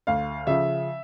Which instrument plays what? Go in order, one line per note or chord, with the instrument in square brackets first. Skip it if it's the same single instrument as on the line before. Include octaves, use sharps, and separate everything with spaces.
[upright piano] D2 F5
C#3 F3 E5